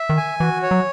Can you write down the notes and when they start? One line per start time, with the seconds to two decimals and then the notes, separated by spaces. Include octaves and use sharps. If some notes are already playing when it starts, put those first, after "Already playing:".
Already playing: E5
0.09 D#3
0.17 G#5
0.40 E3 F#4
0.63 C#5
0.71 F#3